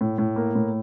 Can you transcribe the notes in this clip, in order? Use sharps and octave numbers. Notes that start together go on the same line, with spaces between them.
A2
A2
A#3
A2